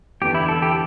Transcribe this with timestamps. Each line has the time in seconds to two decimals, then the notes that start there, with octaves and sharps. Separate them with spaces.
0.22 E2 D3 B3 D4 G4
0.34 E4
0.49 A4
0.62 G4